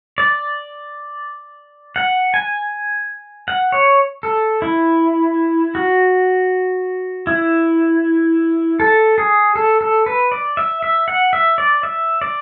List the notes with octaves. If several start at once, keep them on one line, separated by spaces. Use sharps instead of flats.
D5
F#5
G#5
F#5
C#5
A4
E4
F#4
E4
A4
G#4
A4
A4
B4
D5
E5
E5
F#5
E5
D5
E5
D5